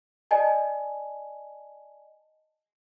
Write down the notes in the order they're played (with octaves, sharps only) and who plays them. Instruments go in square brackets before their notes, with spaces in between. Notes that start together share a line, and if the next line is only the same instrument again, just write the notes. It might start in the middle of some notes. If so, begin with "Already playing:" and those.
[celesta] D5 D#5 G#5 A5